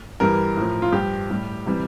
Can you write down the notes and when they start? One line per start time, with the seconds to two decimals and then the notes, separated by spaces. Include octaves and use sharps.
0.20 G2 E3 G3 A#4
0.57 A2 F3
0.82 F4
0.93 G2 F3 G4
1.30 A2 G3
1.66 C3 E3 G3